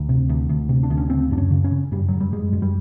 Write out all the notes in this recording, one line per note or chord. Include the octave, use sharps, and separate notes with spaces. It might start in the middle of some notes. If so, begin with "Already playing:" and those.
Already playing: D2
C3
D2
D2
C3
D4
D2
C#4
C#3 C4
F#2 D4
C#4
C#3
C#4
C#3
F#2 G3
F#2 F#3
G3
F#2 G#3
F#2
G3